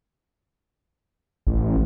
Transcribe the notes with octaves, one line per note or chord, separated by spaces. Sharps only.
A1